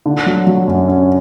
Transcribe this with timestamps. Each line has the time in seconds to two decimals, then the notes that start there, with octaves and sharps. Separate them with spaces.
0.06 D3
0.26 F#3
0.47 F#3
0.68 F#2
0.88 C#4